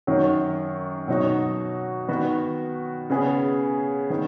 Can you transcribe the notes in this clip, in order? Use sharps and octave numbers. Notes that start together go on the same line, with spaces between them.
F#2 D#3 F#3
B2 F#3 D#4 F#4
D#3 B3 F#4
C#3 B3 G#4
D#3 B3